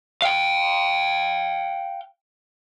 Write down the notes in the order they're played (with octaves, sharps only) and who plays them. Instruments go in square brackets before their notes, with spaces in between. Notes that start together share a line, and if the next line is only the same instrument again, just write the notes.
[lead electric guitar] F5 G5